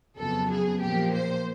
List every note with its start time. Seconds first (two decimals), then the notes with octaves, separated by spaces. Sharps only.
0.18 F2 C#3 F#3 B3 A4
0.50 G#4
0.82 A#2 F3 A#3 G4
1.13 C5